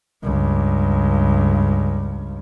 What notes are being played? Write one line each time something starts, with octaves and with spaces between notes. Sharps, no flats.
C#2 G2